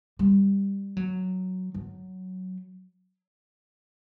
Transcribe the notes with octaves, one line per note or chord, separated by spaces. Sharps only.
G3
F#3
F#3